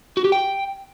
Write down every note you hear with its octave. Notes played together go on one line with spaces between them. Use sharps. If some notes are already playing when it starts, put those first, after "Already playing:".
F#4
G4
G5